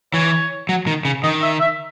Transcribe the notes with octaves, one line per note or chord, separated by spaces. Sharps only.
E3 C#5
F#3
D#3
C#3
D#3 D#5
E5
E5